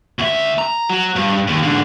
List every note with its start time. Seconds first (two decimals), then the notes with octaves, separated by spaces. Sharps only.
0.19 D2 E5
0.58 A#5
0.89 F#3
1.16 G2
1.47 D#2
1.63 G#2 D3